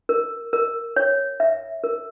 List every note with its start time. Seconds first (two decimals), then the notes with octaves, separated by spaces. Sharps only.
0.09 A#4
0.53 A#4
0.96 C#5
1.40 E5
1.84 A#4